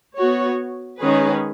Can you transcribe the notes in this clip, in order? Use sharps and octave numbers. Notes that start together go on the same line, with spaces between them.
B3 F#4 C#5
D#3 G#3 C#4 G#4 B4